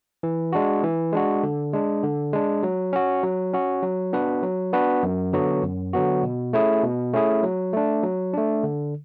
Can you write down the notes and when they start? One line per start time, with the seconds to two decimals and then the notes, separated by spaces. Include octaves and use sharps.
0.23 E3
0.53 G#3 D4 F#4
0.83 E3
1.13 G#3 D4 F#4
1.43 D3
1.73 G#3 D4
2.03 D3
2.33 G#3 D4
2.63 F#3
2.93 C#4 F#4
3.23 F#3
3.53 C#4 F#4
3.83 F#3
4.13 B3 D4 F#4 B4
4.43 F#3
4.73 B3 D4 F#4 B4
5.03 F#2
5.33 D3 F#3 B3 F#4
5.63 F#2
5.93 D3 F#3 B3 F#4
6.23 B2
6.53 A3 C#4 E4 G#4
6.83 B2
7.13 A3 C#4 E4 G#4
7.43 F#3
7.73 A3 D4
8.03 F#3
8.33 A3 D4
8.64 D3